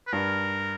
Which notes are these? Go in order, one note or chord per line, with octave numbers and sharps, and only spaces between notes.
B4
G2 A#4